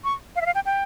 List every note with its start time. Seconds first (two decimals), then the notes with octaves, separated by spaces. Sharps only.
0.04 C#6
0.36 F5
0.41 E5
0.46 F5
0.55 G5
0.65 G5